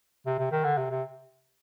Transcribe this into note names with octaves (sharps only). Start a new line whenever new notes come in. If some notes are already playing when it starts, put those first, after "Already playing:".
C3
C3
D#3
D3
C3
C3